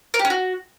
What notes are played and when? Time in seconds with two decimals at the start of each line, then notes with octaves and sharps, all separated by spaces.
0.14 A#4
0.19 G4
0.25 C#4
0.30 F#4